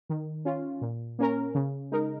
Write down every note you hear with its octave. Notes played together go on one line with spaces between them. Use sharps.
D#3
C#4 F4
A#2
A#3 C#4 A#4
C#3
G#3 D#4 A#4